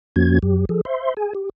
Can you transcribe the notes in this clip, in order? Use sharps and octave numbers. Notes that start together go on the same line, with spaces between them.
F2 F3 A#3 C#4 F#4 G#6
F#2 F#3 G4
F3 G#4 A4
C5 E5 C6
G#4 G#5
G4